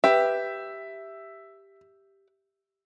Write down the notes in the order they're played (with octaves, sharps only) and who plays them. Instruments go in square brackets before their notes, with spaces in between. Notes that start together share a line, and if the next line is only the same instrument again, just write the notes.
[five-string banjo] G4 B4 [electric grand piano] E5